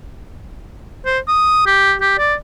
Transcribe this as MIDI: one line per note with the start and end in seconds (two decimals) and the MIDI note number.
1.05 1.19 72
1.28 1.66 87
1.66 1.94 67
2.01 2.16 67
2.18 2.34 74